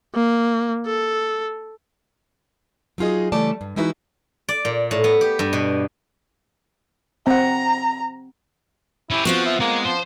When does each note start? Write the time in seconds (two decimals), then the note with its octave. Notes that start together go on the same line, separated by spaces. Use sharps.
0.14 A#3
0.86 A4
2.98 F#3 D#4 F4 G#4 D#5
3.32 C#3 E3 G3 A3 D5 A5
3.61 G2
3.76 E3 G#3 D#4 E4 F#4 B4
4.49 D5
4.65 A#2
4.91 A2
5.04 B3
5.21 G4
5.39 G2
5.53 B2
7.27 C4 F#5 A#5
9.10 C#4 E4 G4
9.25 F3 B3 C4 F4 F#4
9.46 E5
9.60 G#3 A#3
9.85 F3 C5